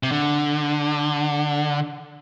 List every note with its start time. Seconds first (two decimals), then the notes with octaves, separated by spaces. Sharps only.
0.03 C3
0.11 D3